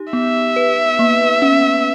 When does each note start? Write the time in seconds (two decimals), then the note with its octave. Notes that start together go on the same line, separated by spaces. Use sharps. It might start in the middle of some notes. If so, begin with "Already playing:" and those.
Already playing: D#4 G4
0.13 B3 E5
0.56 B4
0.99 A#3
1.42 C#4